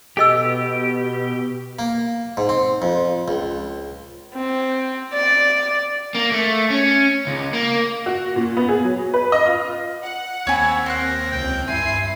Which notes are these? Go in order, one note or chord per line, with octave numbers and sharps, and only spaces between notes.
B2 G4 A4 D#5 E6
A#3
G#2
C4
F2
C#2
C4
D5
A#3
A3
C#4
C#2
A#3
F#4
A#2
B3
G#4
F#3
B4
D#5
F4
F#5
D#2 C4 E4 C#5 G#5
A#4 C5 F#6
C#2 G5
G2 E4 G#5 C6 C7